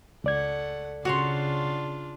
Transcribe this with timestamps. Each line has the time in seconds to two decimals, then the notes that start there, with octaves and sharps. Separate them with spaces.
0.24 C#2 A3 D5 F#5 G#6
1.05 C#3 D4 F4 F#4 C#5 C6